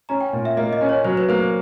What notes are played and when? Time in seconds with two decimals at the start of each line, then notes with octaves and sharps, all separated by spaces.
0.09 C#4 A#5
0.21 G5
0.33 A#2
0.45 E5
0.57 A#3 D#5
0.73 D#5
0.81 C#4
0.89 C#5
1.05 F#3 C5
1.17 B4
1.28 A#3 C5